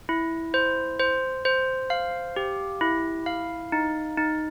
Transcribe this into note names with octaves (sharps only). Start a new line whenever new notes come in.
E4
C5
C5
C5
F5
G4
E4
F5
D#4
D#4